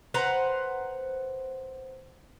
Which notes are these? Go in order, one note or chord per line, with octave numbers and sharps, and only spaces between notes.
B4 C5 F#5 A#5